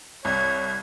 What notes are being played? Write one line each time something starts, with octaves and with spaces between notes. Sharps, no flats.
C2 C#5 G#6